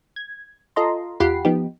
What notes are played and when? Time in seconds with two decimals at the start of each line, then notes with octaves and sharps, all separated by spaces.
0.16 G#6
0.76 F4 A4 D#5 A#5 C6
1.20 E2 F4 G4 F#5 B5 C7
1.45 F3 B3 D#4 G4